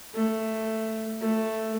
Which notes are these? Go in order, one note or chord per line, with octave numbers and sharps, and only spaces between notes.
A3
A3